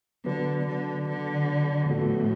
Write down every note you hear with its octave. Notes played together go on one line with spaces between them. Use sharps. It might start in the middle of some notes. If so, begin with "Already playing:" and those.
D3 F#3 B3 F#4 B4
D3
D3
A2 F3 B3 F#4 A4